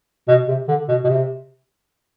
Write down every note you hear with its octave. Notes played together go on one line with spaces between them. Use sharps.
B2
C3
D3
B2
B2
C3